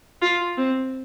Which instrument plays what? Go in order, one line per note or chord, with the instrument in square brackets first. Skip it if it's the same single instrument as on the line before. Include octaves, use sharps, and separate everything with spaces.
[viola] F4
C4